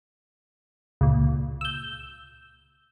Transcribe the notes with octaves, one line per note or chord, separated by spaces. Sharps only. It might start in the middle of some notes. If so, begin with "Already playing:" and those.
C#2 A#2
E6 G6